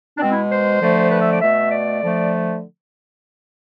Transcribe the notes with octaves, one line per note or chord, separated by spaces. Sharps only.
D4
B2 G#3 C4
E4
C5
D3 F3 A3
B4
E5
D5
B2 A3 E5
D5
D3 F3 A3